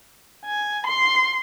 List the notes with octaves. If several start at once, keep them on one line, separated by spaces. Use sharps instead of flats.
G#5
C6